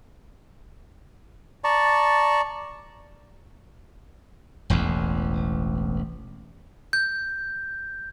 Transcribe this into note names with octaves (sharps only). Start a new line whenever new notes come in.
D5 A5 A#5 C#6
E1 A1 E2
G6